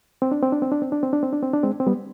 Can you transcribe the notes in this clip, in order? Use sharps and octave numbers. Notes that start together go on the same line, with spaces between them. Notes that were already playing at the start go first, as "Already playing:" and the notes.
C4
D4
C4
D4
C4
D4
C4
D4
C4
D4
C4
D4
C4
D4
G#3 C4
C4
G3 B3